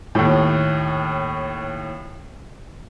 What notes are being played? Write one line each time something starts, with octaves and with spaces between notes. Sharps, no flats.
D#2 A2